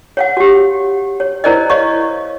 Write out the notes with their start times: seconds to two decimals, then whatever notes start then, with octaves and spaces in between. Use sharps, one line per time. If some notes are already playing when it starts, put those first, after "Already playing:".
0.17 C#5 F5 F#5
0.37 F#4 G4
1.20 C#5
1.44 E4 A#4 C5 D5 D#5
1.70 C#5 D#5 F5 C#6